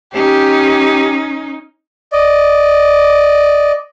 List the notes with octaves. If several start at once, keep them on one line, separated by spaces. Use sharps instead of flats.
C#4 D#4 G4
D5 D#5